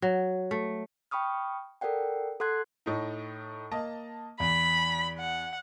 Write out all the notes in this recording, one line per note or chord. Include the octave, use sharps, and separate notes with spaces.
F#3
A3
G5 B5 C#6 D#6 F6
A4 A#4 D5 F#5 G5
A4 F#5 C6 F#6 G#6 C7
A2 A3 D#4
A#3 D#5 A5
E2 B5
F#5